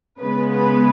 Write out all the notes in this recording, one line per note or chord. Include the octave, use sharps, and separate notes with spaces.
C#3 G#3 B3 B4
B4